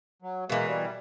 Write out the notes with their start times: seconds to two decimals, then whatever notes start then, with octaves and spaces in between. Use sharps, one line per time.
0.22 F#3
0.50 B2 E3 G#3 A#3
0.67 G3